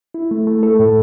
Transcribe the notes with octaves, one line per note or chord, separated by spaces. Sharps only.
E4
A3
A3
A4
A2